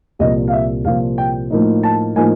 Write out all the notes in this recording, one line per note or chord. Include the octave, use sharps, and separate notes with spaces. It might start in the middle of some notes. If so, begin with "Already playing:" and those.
C2 A#2 F3 A#3 D#5
F5
E5
C2 A#2 F3 A#3 F5
G5
A2 F3 A#3 D#4
A5
A2 F3 A#3 D#4 G#5